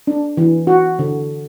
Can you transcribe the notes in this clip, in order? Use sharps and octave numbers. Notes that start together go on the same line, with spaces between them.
D4
E3
F#4
D3